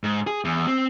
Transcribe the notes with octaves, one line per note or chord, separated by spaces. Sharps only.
G#2
G#4
E2
C4